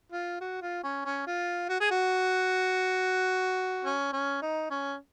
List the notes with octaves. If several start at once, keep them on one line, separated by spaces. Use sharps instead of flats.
F4
F#4
F4
C#4
C#4
F4
F#4
G#4
F#4
C#4
C#4
D#4
C#4